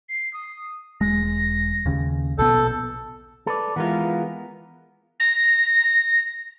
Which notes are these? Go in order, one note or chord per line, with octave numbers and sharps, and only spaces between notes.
C7
D#6
E1 G#3 A#6
D#2 C#3
A#1 B2 B3 A4 G6
A4 B4 D5
E3 G#3 B3 F4 A#4
A#6